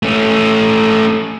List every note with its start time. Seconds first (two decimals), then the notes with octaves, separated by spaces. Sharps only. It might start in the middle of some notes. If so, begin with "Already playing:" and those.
0.03 A3 C#4